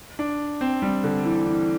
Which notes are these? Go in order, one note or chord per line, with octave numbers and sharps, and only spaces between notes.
D4
C4
G3
D3
E3
E3